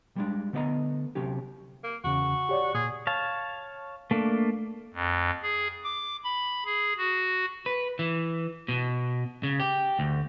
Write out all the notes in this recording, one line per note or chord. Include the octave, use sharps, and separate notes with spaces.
G3 G#3 D4
D3 A3 B3 D5 D#5 A#5
C3 F#3 C#4 G4
A#3
E2 C#3 F#4
G4 C#5 D5
A#2 G#4
C#5 F5 A5
A3 A#3 D4
F2
G#4
D6
B5
G#4
F#4
B4
E3
B2
C#3
G4
D2